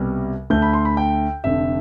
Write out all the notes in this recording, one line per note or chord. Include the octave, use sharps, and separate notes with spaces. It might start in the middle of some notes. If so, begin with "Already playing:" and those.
Already playing: C2 B2 G3
D2 D3 A3 G6
B5
C6
B5
G5
F1 F2 D3 E5